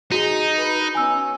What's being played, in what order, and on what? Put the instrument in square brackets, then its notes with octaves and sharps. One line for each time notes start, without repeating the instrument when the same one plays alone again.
[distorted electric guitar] D#4 [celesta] F#4 [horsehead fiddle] G#4
[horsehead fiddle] B4
[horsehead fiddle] B3 C#4 [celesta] G#5 E6